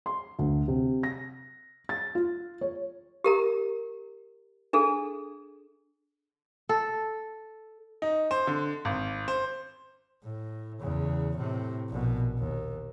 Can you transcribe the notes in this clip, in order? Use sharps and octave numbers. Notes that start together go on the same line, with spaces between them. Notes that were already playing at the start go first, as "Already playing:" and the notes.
C6
D2
C3
A#6
A6
F4
C#5
G4 A#4 A#5
D4 G#4 A4
A4
D#4
C5
D3
G#1
C5
A2
E2 C#3
A2 C3
A#1 B2
D#2